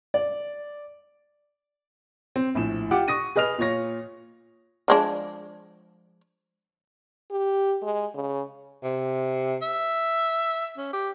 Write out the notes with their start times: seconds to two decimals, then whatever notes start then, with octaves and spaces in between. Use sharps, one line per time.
0.14 D5
2.36 C4
2.55 A#1 A2 E7
2.91 F4 G4 F#5 G5 D6
3.08 C#6 D#6 A#6 D#7
3.36 G#4 B4 D#5 F6 F7
3.58 A#2 F4 C#5 A#6
4.88 F3 G#3 D4
7.31 G4
7.82 G#3
8.14 C#3
8.83 C3
9.62 E5
10.77 C#4
10.93 G4